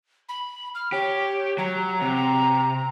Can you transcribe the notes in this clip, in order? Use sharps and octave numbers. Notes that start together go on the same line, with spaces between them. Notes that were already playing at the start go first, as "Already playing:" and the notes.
B5
F6
G4 C#5
F#3 A#5
C3